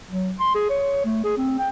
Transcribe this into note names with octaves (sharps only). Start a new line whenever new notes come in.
F#3
C6
G#4
C#5
A3
G#4
C4
G5